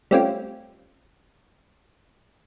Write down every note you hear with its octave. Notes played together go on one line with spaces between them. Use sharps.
G3 A3 C4 C#4 F4 G4